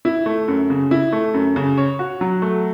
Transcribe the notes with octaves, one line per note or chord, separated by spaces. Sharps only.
E4
A3
F#2
C#3
E4
A3
F#2
C#3
C#5
F#4
F#3
A3